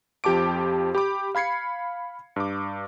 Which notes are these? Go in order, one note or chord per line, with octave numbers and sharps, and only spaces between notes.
F2 F3 G4 A5 D6 D7
G4 B5 D6
F5 B5 G#6 C7 C#7
G2 D6